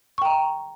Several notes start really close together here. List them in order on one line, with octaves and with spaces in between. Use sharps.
C#6 G5 A#5